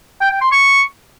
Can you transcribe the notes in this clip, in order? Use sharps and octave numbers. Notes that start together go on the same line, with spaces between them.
G5
G5
C6
C#6